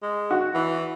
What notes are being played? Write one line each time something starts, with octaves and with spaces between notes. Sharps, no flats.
G#3
F#4
E3